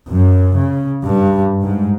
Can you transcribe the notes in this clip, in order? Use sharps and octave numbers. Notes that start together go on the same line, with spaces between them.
F#2
C#3
G2
G#2